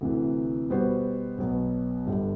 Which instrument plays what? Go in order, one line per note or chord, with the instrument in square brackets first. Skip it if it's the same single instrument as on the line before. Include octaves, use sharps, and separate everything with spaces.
[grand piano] D2 C3 E3
B2 G3 B3 F#4 C5
B1 B2 F#3 B3
G1 G2 D3 G3